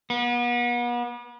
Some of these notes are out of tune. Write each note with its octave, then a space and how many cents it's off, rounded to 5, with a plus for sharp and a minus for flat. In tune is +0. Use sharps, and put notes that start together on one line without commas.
B3 -40